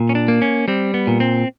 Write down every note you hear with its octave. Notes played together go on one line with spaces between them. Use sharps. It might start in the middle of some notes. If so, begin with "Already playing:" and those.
Already playing: A#2
C#4
D4
A#3
C#4
G3 C4
B3
A#2
C4